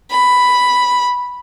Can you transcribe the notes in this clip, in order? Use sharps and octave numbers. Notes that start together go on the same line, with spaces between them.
B5